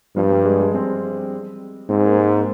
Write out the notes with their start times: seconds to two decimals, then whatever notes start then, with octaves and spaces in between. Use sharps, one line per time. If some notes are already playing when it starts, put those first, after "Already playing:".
0.16 G2 F3
0.31 G3
0.45 G#3
0.60 G#3
0.74 C4
1.89 G#2 C4
2.04 A#3
2.18 G#3
2.33 A#3